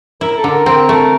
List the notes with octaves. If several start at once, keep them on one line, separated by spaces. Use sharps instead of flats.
E4 A#4
A4
D3
A#4
C4 A#4
A3